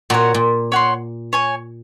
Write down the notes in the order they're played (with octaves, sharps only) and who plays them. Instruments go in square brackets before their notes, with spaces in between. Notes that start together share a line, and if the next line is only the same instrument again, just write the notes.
[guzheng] A#2 [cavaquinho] F#4 A#4 C#5 F#5
[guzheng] A#2
[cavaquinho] C#5 F#5 C6
C#5 G#5 C#6